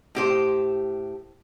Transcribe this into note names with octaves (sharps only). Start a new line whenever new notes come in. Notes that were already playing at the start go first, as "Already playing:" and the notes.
A2 G4 C5